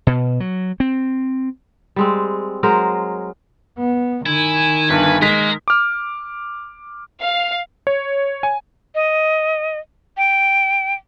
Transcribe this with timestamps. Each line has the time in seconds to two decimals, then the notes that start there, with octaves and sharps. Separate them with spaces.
0.07 B2
0.40 F#3
0.80 C4
1.96 G3 G#3 C4
2.63 F#3 G#3 A#4 C5
3.78 B3
4.26 D#3 E4 G#5
4.89 G1 G2 B4
5.22 G#3 A#4 F5 B6
5.68 D6 F6
7.20 F5
7.87 C#5
8.43 G#5
8.95 D#5
10.17 G5